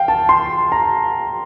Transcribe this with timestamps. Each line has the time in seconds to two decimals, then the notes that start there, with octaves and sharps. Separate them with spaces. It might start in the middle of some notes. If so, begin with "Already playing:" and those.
Already playing: F5 G5
0.08 A5
0.29 C6
0.72 A#5